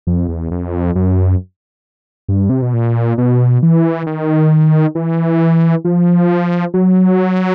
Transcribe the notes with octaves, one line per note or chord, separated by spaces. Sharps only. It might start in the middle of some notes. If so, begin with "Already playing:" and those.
F2
E2
F2
F#2
G2
C3
B2
A#2
B2
E3
D#3
E3
F3
F#3